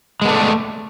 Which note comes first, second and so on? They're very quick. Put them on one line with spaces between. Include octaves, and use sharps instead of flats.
G#3 B3 A4 D5 A3